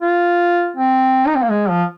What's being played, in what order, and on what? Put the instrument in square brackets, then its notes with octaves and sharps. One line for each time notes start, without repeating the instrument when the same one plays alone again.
[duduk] F4
C4
D#4
C4
A#3
G#3
F3